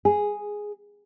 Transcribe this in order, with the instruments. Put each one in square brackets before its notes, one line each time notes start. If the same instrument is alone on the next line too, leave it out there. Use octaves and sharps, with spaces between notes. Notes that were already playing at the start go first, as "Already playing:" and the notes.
[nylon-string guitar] G#4